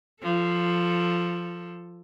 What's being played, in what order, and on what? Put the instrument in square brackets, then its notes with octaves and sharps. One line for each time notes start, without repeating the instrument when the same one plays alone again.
[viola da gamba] F3 A4